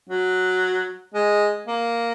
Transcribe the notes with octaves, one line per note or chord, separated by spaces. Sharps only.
F#3
G#3
A#3